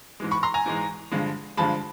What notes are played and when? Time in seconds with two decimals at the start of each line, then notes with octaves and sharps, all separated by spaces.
0.20 G#2 E3 G#3
0.31 B5 C#6
0.43 A#5 C6
0.54 G#5 A#5
0.66 G#2 E3 G#3
1.11 G2 D3 F3 G#3
1.57 G2 D3 F3 G#3 A5 B5